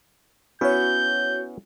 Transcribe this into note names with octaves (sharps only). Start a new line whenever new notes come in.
B3 C#4 E4 F#4 C#5 G6